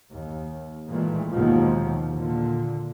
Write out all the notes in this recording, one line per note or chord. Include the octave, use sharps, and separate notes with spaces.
D#2
A#2 D#3 E3 G#3 A3
D#2 B2 F3 G#3
A#2 D3